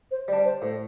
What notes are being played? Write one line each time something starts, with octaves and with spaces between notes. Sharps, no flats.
C5
G3 D4 D5
C5
A2 C5